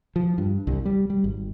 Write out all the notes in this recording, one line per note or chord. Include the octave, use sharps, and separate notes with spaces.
F3
G2
C2
G3
G3
G#1